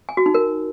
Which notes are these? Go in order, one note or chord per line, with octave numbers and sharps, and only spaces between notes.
G#5
F#4
D#4
A#4